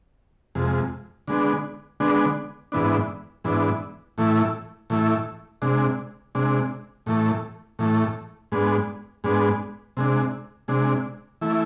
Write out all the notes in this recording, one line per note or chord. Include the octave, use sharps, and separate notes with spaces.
F2 C3 G#3
D3 G#3 B3 D4
D3 G#3 B3 D4
G#2 E3 B3 D4
G#2 E3 B3 D4
A2 E3 A3 E4
A2 E3 A3 E4
C3 G#3 D4
C3 G#3 D4
A2 E3 A3
A2 E3 A3
G#2 G#3 B3 D4
G#2 G#3 B3 D4
C3 G#3 D4
C3 G#3 D4
E3 A3 E4